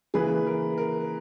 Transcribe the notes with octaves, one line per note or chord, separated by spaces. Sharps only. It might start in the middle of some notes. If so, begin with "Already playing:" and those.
C#3 E3 A#3 G#4 B4
A#4
A#4